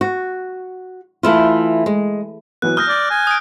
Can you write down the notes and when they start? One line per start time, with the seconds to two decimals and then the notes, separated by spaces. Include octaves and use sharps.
0.01 F#4
1.23 E3 A3 E4 F4
1.86 G#3
2.62 E3 F#3 B3 F#6
2.77 D#6 F6 G6 A#6
2.89 D5
3.11 G#5
3.27 D#6 D7